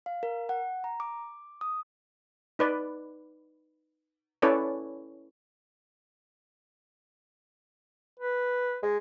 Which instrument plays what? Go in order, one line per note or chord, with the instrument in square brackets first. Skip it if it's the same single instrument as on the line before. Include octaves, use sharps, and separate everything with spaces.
[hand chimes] F5
A#4
F#5
A#5
D6
D#6
[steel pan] D#4 B4 D5
C#4 E4 A4 B4 C#5 D5
[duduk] B4
[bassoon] G#3